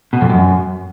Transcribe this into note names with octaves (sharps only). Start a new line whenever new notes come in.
B2
F2
F#2